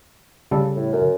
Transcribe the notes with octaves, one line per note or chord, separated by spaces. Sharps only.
C#3 G3 A4
A2
F#2